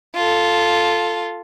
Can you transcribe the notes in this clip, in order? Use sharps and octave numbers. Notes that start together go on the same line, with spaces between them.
F4 A4